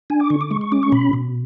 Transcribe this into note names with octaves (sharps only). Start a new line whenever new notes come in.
D4 G#5
D6
D3 C#6
D6
G#3 C#6
C#6
C#4 D6
C#6
B2 B5
B2